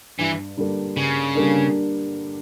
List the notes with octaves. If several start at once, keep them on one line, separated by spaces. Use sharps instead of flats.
G2 E3
D3 G3 A#3 D4
G2 C#3
D3 G3 A#3 D4